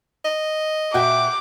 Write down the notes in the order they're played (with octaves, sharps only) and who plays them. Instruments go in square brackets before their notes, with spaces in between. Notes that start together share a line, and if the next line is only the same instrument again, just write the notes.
[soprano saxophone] D#5
[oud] A#2 E5 [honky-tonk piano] F#4 G5 [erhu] D6